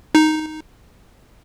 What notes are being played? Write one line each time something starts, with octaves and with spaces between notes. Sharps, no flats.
D#4